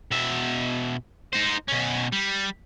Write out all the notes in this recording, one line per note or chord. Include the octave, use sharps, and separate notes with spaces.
B2 E5
D#4 C5
B2 C#4
G3